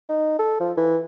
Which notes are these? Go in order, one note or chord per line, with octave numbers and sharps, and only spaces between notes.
D#4
A4
F3
E3